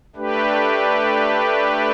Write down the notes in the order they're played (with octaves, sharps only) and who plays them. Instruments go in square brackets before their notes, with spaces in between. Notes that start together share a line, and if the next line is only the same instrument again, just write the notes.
[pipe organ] A3 D4 G4 B4